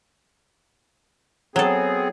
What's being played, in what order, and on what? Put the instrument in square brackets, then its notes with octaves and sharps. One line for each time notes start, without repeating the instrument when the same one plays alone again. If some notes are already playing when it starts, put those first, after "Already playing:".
[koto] F#3 A4 [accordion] B3 C4 G#4